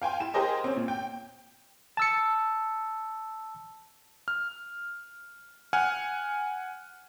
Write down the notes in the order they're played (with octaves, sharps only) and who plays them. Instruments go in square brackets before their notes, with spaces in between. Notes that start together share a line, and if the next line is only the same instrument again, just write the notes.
[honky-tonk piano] F5 G5 G#5 C6
E4 E7
G4 G#4 A#4 C5 D#5 G#5
C4 C#4
A#2
G5
[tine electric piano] A5 E6 C#7
[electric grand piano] F6
F#5 G#5 F6